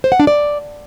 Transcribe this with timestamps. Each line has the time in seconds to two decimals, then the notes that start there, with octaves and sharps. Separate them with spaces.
0.04 C5
0.12 F#5
0.20 D4
0.27 D5